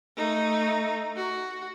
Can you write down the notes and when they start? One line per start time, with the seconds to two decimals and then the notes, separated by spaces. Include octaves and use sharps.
0.17 A3 D#4
1.16 F#4